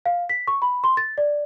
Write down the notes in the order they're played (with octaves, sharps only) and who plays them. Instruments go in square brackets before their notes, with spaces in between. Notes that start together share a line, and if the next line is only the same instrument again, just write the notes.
[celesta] F5
B6
C#6
B5
C6
A6
D5